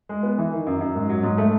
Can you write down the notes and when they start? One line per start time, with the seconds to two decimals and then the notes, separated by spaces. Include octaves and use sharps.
0.09 G#3
0.23 B3
0.38 E3
0.52 D#3
0.67 F#2
0.81 F#2
0.95 G#2
1.09 F#3
1.23 G#2
1.38 A3